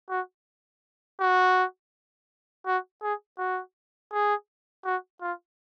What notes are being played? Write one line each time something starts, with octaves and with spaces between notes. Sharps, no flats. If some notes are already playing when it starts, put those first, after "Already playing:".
F#4
F#4
F#4
G#4
F#4
G#4
F#4
F4